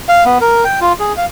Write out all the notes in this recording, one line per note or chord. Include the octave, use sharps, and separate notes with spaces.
F5
B3
A#4
G5
F4
G#4
F5